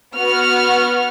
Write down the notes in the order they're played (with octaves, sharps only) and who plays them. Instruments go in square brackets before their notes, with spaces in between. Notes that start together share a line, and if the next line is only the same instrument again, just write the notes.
[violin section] B3 F#4 F6